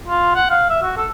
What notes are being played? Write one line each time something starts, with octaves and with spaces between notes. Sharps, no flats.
F4
F#5
F5
E5
F#4
A4